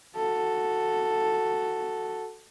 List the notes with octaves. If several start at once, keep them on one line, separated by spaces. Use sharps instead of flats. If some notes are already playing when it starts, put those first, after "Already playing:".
F#4 A4